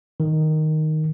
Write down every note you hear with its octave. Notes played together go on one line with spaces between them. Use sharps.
D#3